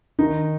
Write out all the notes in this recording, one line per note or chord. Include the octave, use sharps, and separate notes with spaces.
D#3 D#4